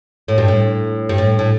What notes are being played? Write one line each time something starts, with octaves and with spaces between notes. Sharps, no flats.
A2
G2
A2
G2
A2
A2